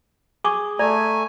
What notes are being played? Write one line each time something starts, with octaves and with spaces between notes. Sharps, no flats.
G#4 G#5 C#6 D6
A3 D5 G#5 A#5